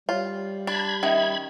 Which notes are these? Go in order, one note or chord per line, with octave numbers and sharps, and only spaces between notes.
G3 F4 C#5
D4 B5 G#6
D#3 C#4 E5 G#5